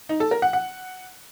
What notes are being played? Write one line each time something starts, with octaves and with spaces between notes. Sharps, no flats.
D#4
A4
A#4
F#5
F#5